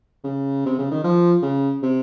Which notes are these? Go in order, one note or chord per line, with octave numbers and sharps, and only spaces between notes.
C#3
C3
C#3
D#3
F3
C#3
C3